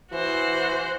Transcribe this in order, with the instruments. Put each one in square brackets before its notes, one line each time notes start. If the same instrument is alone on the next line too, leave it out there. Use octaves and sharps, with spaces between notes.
[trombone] E3 [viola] F#4 C5